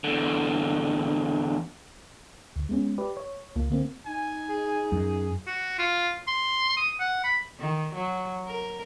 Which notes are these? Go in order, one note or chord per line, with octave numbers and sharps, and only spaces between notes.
E2 D3
D2
G#3 B3 C#4
G4 B4 D5
C#5
C#2 A#3 F4
D3 A#3 C4
D#4 G#5
G#4
F#2
F#4
F4
C6
D#6
F#5
B5
D#3
F#3
A#4